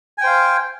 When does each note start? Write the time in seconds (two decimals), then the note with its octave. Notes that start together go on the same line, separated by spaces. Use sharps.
0.18 G#5
0.21 G5
0.24 C5
0.27 F5